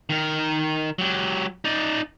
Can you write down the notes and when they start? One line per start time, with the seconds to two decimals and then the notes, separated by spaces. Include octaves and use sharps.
0.10 D#3 A#4
0.99 F#3 G4
1.64 D#4 D5